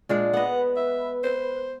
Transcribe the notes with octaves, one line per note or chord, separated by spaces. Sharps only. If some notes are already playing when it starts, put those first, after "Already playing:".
A#2 G#3 D4
B3 B4 D#5 F#5
E5
C5